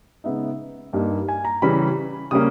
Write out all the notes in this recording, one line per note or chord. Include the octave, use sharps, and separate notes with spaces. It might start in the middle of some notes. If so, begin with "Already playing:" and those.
C#3 G#3 B3 D#4 E5
G2 G3 A#3 D#4
G#5
A#5
C#3 E3 G3 C#4 B5
C#3 G3 A#3 C#4 D#6